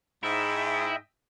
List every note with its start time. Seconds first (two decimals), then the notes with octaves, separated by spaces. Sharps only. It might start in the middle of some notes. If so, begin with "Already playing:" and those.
0.23 G#2 E4 D#5 E5 G5